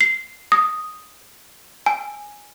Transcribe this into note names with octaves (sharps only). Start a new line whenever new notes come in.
C7
D#6
G#5